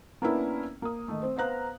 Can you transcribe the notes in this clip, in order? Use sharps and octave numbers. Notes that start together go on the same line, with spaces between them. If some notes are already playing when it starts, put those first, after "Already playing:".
A#3 B3 C#4 D4 E4
A#3 D#6
D#3 A3
C4 C5
B3 C5 F5 A#5 F#6